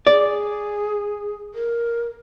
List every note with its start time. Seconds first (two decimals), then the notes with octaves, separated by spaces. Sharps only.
0.07 G#4 D5
1.54 A#4